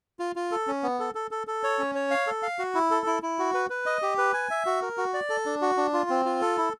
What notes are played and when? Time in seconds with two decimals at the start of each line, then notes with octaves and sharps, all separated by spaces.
0.19 F4
0.36 F4
0.51 A4
0.67 C#4
0.83 B3
1.00 A4
1.15 A4
1.31 A4
1.47 A4
1.63 C#5
1.79 C#4
1.95 C#5
2.11 F5
2.27 A4
2.43 F5
2.59 F#4
2.75 E4
2.91 A4
3.06 E4
3.23 E4
3.39 F#4
3.54 B4
3.70 B4
3.86 D#5
4.02 G4
4.18 B4
4.34 G#5
4.51 E5
4.66 F#4
4.82 A#4
4.98 F#4
5.14 D5
5.30 A4
5.46 D4
5.62 F#4
5.77 D4
5.93 F4
6.10 C4
6.25 F4
6.41 A4
6.57 E4